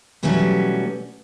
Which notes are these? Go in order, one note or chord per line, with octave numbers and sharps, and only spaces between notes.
B2 E3 F#3 G3 A3 C#4